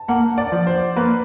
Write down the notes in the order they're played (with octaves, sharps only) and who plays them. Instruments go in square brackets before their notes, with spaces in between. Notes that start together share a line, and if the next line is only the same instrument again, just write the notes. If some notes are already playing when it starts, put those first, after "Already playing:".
Already playing: [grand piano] A5
[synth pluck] A#3 [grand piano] F#5
[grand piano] D5
[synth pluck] F3
[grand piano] C5
[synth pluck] A#3 [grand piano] B4